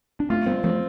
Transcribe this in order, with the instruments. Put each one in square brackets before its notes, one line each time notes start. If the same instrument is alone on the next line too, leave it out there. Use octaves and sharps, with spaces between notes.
[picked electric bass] D4
[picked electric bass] A3 C4 [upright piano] F4
[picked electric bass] G3 B3 [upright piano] C4
[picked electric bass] F3 A3 [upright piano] C4